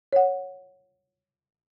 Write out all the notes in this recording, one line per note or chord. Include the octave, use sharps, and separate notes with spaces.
C#5 F#5